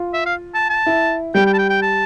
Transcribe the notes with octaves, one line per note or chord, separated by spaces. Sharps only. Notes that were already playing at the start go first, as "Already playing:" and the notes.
Already playing: F4
E5
F5
A5
A5
E4
G3 G5
G5
A5
G5
G5
A5